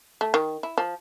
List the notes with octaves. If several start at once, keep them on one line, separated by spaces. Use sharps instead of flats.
A3
D#3
E4
F3